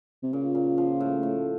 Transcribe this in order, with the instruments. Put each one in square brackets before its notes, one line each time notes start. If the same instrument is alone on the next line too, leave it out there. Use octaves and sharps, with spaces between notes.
[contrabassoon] C3
[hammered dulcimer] A#2 [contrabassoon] C#3
[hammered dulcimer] A#2
F3
A2
A2